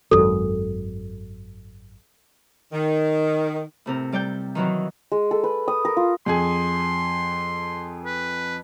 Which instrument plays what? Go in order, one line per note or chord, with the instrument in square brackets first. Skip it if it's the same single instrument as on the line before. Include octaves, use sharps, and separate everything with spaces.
[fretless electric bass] G#1 F#2 [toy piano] A4
[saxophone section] D#3
[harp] A2 C3 A#4
G3 D5 G5 G6
D#3 E3 F#3 D#4
[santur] G#3
A4
B4
D#6
A#4
F4
[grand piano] F2 G#4 G#5 [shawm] C6
[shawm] B4